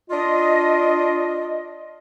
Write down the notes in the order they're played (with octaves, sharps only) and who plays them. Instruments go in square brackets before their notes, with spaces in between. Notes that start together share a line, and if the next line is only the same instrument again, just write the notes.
[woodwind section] D4 F4 D#5